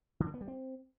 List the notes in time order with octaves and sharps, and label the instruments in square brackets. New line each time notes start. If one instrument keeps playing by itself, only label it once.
[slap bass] D3
A#3
B3
G3
C4